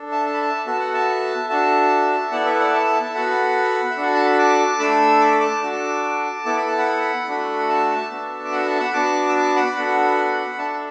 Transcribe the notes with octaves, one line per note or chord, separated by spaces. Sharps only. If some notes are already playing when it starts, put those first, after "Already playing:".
Already playing: D4 A4
E5 A5
A5
B5
E5 A5
B3 F#4 A4 A5
F#5
E5 A5
D4 F#4 A4 E5 A5
B3 E4 A4 D5 F#5
B4 E5
D5 F#5
E5 A5
A5
B3 F#4 A4 F#5 B5
E5
D4 F#4 A4 F#5
A5
B5
A5 D6
A3 D4 A4 B5 E6
D6
B5
A5 D6
D4 F#4 A4
B3 E4 A4 D6
B5
A5
F#5 B5
A3 D4 F#4 A4
F#5
E5 A5
B3 D4 F#4 A4
D6
F#5 B5
E5 A5
F#5 B5
B3 D4 F#4 A5 D6
E6
A5 D6
F#5 B5
B3 D4 F#4 A4
D4 A4 E5 A5